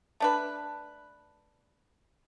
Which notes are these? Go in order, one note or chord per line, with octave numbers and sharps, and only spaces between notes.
A3 D4 B4